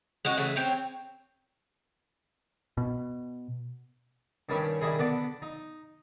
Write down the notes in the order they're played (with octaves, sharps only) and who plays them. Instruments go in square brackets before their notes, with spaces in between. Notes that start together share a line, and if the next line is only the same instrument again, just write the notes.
[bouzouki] G#3 C#4 F#4
C#3 E3 A3
C4 C#5
[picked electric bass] B2
[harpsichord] G2 D#3 G3 C#4 C#6
D#3 G3 D#4 E4 G#4
D3 B3 D5 D6
D#4